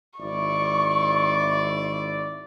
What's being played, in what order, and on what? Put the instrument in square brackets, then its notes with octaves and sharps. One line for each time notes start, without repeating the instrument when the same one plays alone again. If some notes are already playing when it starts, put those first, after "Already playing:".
[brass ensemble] G#1 E4 D5 [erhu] C#6